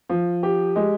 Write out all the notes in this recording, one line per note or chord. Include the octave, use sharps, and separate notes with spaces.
F3
G4
G#3